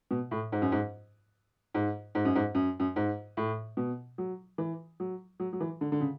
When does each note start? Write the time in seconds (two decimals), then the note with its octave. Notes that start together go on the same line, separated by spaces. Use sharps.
0.11 B2
0.31 A2
0.52 G#2
0.62 F#2
0.72 G#2
1.74 G#2
2.15 G#2
2.25 F#2
2.36 G#2
2.55 F#2
2.80 F#2
2.96 G#2
3.37 A2
3.77 B2
4.18 F#3
4.58 E3
5.00 F#3
5.40 F#3
5.53 F#3
5.60 E3
5.81 D3
5.92 D3
6.01 C#3